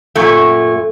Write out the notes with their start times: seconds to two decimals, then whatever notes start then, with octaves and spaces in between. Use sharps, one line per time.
0.15 F#2 A#2 A3